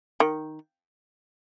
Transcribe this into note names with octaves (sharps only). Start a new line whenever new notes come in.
D#3